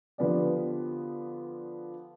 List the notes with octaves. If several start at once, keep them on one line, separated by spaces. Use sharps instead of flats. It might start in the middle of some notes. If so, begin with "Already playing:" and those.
D3 F3 B3 G4 D5